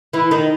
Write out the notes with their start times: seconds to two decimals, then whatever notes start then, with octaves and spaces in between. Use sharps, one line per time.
0.13 E3 E4
0.31 D#3 D#4